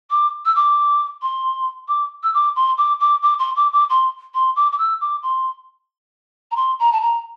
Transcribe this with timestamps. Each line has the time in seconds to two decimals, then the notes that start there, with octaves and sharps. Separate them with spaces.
0.10 D6
0.45 E6
0.55 D6
1.22 C6
1.88 D6
2.23 E6
2.33 D6
2.55 C6
2.77 D6
3.00 D6
3.22 D6
3.39 C6
3.56 D6
3.73 D6
3.89 C6
4.34 C6
4.56 D6
4.72 D6
4.78 E6
5.01 D6
5.22 C6
6.51 A#5
6.56 C6
6.79 A#5
6.92 A5
7.01 A#5